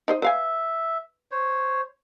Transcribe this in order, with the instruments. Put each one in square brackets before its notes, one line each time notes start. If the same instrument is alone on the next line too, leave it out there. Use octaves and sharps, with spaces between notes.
[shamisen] D#4 C5 D#5
[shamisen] B4 F5 G#5 [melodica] E5
[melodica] C5 C#5